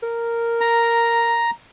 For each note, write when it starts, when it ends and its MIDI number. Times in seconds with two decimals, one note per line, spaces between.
0.03 1.43 70
0.61 1.50 82